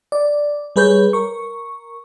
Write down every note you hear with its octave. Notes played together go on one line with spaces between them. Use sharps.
D5
G3 G#4 B4 C#5 G6
A#4 C#6